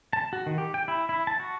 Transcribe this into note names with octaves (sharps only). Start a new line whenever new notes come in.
A5
F#4
D#3
G4
G5
E4
E4
A5
F#4